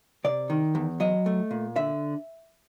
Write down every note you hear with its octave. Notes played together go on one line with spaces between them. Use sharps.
C3 D5
D#3
E2
F#3 D#5
A3
A#2
D3 E5